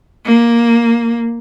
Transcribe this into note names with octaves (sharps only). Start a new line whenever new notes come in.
A#3